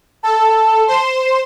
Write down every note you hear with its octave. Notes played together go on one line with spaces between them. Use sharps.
A4 A5
C5 C6 E7